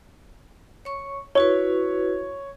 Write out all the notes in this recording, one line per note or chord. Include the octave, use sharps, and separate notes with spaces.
C#5 C#6
E4 F#4 B4 C#5